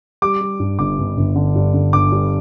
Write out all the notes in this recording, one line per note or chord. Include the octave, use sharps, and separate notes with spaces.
G3 D6
G3
G2
G1 D6
G1
G1
D3
G2
D3
G1 D6
G2